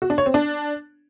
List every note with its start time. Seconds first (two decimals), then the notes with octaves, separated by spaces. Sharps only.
0.02 F#4
0.10 D4
0.18 C#5
0.26 C4
0.34 D4